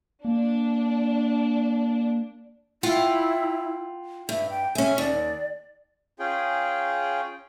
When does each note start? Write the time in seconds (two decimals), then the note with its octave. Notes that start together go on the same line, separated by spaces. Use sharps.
0.25 A#3 D4
2.83 E4 F4 F#5 G5
4.29 G2 E5
4.50 G5
4.75 C#4 G#4 E5
4.98 D#2 D5
6.19 C#4 F4 G#4 G5